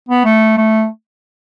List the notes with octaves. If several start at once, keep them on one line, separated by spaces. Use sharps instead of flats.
B3
A3
A3